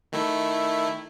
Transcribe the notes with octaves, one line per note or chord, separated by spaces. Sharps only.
D#3 A3 E4